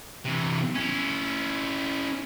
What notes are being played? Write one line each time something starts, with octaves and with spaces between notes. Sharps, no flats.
C3 E3
C#4 E4